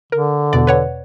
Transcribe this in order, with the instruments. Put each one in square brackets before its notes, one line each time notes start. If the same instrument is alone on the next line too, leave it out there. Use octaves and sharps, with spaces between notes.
[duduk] D3 [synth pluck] A#4
[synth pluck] E2 B2 D5
B4 C#5 F#5